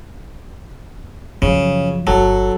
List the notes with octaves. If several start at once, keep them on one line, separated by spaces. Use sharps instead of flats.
F#2 C#3 F3
G1 F#3 A4